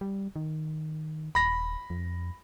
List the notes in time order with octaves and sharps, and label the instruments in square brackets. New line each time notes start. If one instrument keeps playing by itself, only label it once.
[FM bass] G3
D#3
[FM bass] D#1 [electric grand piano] B5 A#6
[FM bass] F2